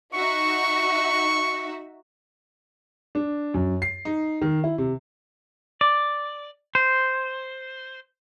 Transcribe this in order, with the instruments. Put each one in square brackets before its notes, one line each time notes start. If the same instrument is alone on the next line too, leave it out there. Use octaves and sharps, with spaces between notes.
[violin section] D#4 F#4 E5 [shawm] C#6
[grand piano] D4
F#2
C7
D#4
D#3
E4
C3
[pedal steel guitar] D5
C5